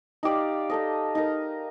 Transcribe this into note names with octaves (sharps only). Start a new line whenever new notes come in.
D#4 G4 D5 F5
D#4 A4 D#5
D#4 A#4 D#5